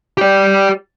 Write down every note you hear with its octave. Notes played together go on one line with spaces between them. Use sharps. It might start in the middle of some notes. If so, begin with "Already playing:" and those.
G4 D5